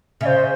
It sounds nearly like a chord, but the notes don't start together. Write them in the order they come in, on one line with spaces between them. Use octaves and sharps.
C#3 E5 C5